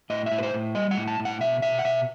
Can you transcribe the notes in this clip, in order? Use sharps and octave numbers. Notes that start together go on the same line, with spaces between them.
A2 D#5
E5
A2
B4
C5
A2
G3 D#5
F#5
A2
A5
A2
F#5
B2 E5
B2 E5
F#5
B2 E5